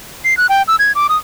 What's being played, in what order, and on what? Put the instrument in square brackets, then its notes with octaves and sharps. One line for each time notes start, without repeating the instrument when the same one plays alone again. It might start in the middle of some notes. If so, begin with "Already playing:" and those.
[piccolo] C7
F#6
G5
E6
G#6
D6
D#6